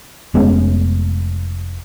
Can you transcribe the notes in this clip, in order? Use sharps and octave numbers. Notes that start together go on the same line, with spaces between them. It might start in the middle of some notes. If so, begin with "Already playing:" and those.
F1 G#3 B3 C#4